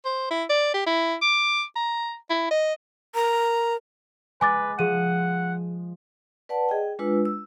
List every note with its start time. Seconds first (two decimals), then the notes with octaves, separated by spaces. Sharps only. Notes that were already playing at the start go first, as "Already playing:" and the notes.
0.05 C5
0.30 E4
0.49 D5
0.74 G4
0.86 E4
1.22 D6
1.76 A#5
2.30 E4
2.51 D#5
3.15 A#4 A#5
4.41 G#3 B4 G#5 D6 A6
4.79 F3 G#4 F#5 D#7
6.49 B4 D5 F#5 A5
6.69 G#4 D#5 G5
6.99 G#3 D4 F4 B4 E6
7.25 E6